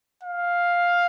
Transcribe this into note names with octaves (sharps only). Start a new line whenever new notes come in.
F5